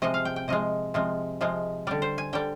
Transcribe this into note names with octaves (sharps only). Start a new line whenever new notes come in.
C3 F3 G#3 D#5
F5
G5
G5
C3 F3 G#3 D#5
C3 F3 G#3
C3 F3 G#3
D3 G3 D5
C5
G#5
D3 G3 G5